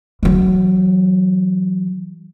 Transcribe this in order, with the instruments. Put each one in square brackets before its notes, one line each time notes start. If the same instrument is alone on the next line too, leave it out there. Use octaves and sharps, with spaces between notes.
[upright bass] E3 F#3